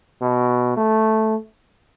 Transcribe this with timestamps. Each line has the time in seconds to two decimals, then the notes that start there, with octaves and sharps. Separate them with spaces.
0.21 B2
0.77 A3